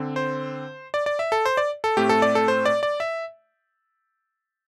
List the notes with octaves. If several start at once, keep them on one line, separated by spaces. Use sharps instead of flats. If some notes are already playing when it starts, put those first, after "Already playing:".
Already playing: D3 C4
C5
D5
D5
E5
A4
C5
D5
A4
A2 A3 C4 G4
A4
D5
A4
C5
D5
D5
E5